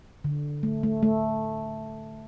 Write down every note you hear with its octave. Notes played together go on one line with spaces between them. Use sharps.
D3
A3
A3
A3